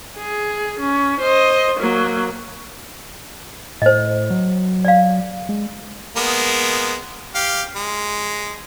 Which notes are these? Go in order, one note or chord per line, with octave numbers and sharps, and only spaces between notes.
G#4
C#4
C5 D#5
F#3 A#3
A2 C5 D#5
F#3
D5 F5
G#3
G#3 A#3 B3
G4 F5
G#3